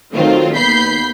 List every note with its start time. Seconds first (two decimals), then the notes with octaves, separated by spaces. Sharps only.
0.14 D#3 F#3 A3 C4 F4
0.56 D#2 B3 B5 G6 B6 C7